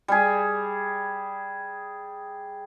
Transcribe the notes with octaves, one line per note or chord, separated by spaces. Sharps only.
G3 G#4